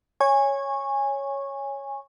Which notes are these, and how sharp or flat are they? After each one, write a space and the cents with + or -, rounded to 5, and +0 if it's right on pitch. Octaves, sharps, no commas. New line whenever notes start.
C#5 +0 G#5 -15 C#6 -15